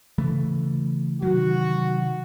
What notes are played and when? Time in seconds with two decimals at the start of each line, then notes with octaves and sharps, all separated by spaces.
0.18 C#3 E3 A3
1.23 C3 D#3 F#3 F#4